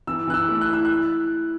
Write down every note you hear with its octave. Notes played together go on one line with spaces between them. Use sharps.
E3 E6
E3 F#6
E6
A3
F#6
E4
E6
F#6